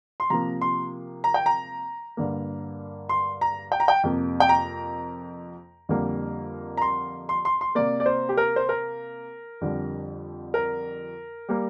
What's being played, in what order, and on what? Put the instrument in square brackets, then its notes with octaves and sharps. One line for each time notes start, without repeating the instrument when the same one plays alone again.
[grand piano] C6
C3 F3 A#3 A#5
C6
A#5
G5
A#5
G2 D3 A#3
C6
A#5
G5
A#5
G5
F2 C3 A#3
G5
A#5
F2 D3 G3 A#3
A#5
C6
C6
C6
C6
C3 A#3 D5
D5
C5
G4
A#4
C5
A#4
F2 D3 G3
A#4
G3 A#3